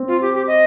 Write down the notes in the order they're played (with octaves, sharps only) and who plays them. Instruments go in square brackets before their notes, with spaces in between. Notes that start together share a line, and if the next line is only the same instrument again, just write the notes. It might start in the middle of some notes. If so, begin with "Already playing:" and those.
Already playing: [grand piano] C4
[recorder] F4
G4
G4
D#5